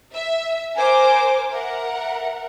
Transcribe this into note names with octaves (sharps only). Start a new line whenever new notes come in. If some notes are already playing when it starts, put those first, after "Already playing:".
E5
A#4 C5 G#5 D6
A#4 E5 F#5